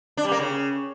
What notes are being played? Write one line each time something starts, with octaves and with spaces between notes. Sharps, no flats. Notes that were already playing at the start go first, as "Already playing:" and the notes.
D4
G3
A#3
C#3